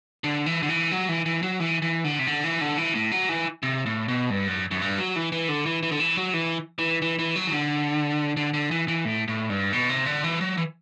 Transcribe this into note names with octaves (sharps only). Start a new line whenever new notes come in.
D3
E3
D3
E3
F#3
E3
E3
F#3
E3
E3
D3
C3
D3
E3
D3
E3
A2
F#3
E3
C3
A2
B2
G2
F#2
F#2
G2
F#3
E3
E3
D3
E3
E3
D3
E3
F#3
E3
E3
E3
E3
F#3
E3
D3
D3
D3
E3
E3
A2
A2
G2
B2
C3
D3
E3
F#3
E3